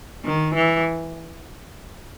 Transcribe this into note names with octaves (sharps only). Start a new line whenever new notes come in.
D#3
E3